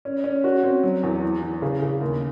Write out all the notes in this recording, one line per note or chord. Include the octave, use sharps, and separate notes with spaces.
C#4
C#4
F#4
C4
F#3
E2
E3
E3
C#3
C#3
D#2